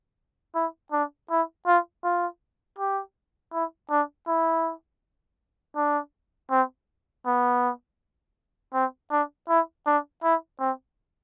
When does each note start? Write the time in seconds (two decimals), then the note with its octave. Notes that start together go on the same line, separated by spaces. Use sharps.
0.55 E4
0.92 D4
1.30 E4
1.67 F4
2.04 F4
2.79 G4
3.53 E4
3.91 D4
4.27 E4
5.76 D4
6.51 C4
7.26 B3
8.74 C4
9.11 D4
9.49 E4
9.86 D4
10.23 E4
10.60 C4